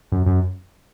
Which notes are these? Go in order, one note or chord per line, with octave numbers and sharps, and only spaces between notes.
F#2
F#2